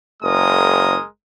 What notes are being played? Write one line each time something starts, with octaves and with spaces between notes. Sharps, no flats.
F#1 G#3 A#4 D#6